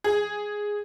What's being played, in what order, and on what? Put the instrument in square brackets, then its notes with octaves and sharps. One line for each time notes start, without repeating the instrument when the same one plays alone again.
[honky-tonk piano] G#4